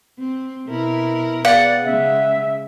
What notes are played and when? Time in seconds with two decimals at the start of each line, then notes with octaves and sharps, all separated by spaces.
0.19 C4
0.67 B2 E4 A#4
1.45 B3 G#4 D5 F5 F#5
1.85 C#3 G#3 E5